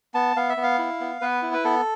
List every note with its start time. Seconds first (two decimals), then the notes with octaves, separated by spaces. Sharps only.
0.14 B3 A5
0.36 B3 F5
0.50 E5
0.57 B3
0.63 F5
0.79 E4
1.01 B3
1.21 B3 B4
1.42 E4
1.53 B4
1.64 B3 A4